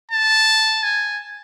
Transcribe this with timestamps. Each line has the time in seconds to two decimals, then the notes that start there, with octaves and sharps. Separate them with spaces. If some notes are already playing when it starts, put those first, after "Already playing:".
0.11 A5
0.83 G#5